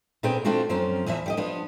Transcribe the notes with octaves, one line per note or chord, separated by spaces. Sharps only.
A#2 B3 C4 G#4 G5
F3 A3 C4 D4 F4 F#4
F#2 F3 F#3 C4 C#4
E2 E3 F3 E5
G3 G4 D#5
F3 B3 D4